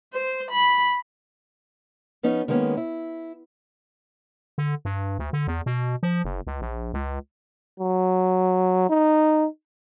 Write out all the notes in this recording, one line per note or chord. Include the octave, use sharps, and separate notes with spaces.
C5
B5
F3 B3 C#4 D#4
D#3 G#3 A#3 B3 C#4
E4
D3
G2
D2
D3
E2
B2
F3
F#1
C#2
A#1
C#2
F#3
D#4